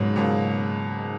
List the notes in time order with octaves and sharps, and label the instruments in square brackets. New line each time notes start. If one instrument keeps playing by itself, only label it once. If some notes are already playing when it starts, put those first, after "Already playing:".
Already playing: [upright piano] C#2 B2 F#3 A#3 [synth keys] G#2
[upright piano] C#2 B2 F#3 A#3